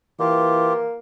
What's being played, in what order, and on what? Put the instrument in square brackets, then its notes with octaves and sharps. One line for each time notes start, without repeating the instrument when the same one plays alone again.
[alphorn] E3 [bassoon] A#3 [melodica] F4 G4